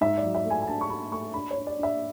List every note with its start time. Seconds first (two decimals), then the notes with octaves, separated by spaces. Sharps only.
0.01 G#2 E5
0.18 D5
0.23 F#3
0.35 E5
0.45 A3
0.50 G#5
0.62 G#5
0.67 D4 A5
0.81 C#6
0.89 D4 B5
1.12 A3 C#6
1.34 D4 B5
1.51 C#5
1.56 D4
1.67 D5
1.78 D4 E5